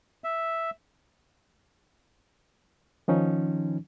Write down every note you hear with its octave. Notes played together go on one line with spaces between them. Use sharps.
E5
D#3 F3 C#4 D#4